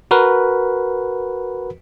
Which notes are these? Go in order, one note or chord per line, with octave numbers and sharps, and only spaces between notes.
F#4 A#4 B4